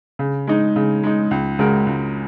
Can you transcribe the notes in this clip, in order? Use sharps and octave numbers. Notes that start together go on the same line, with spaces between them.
C#3
G#3 D#4
C#3
G#3 D#4
C#2
C#3 G#3 F#4 A#4
C#2